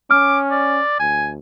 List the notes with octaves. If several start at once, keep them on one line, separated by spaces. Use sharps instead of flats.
C#4 D6 F6
D5
D2 G#5